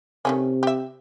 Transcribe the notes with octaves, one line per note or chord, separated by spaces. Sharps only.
C3 D#3 A3 C#4
G4 E5